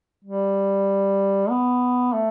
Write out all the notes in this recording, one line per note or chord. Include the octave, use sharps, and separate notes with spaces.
G3
B3
A3